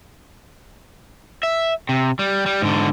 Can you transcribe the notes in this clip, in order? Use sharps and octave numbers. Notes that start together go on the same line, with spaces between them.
E5
C3
G3
G3
G#2 D3